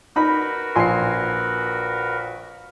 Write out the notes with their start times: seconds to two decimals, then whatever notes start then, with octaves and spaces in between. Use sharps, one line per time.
0.16 D#4 F#4 A#4 B4 B5
0.76 A#1 G#5 C6 C7